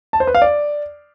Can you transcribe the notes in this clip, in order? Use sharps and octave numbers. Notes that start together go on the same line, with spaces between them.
A5
C5
B4
F5
D5